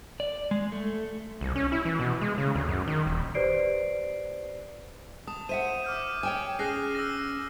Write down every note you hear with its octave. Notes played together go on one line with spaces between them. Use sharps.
D5
G#3
A3
C2
C#4
E4
E3
B2
G#3
C#3
D2
F#2
D#3
D#1
G4 B4 C5 D5 C7 D7
A5 D#6
C5 E5 F#5 D#7 E7
D6 F6 G6
C#5 G5 G#5
C#4 G#4 F#6 A#6 C7
E6 F6 A#6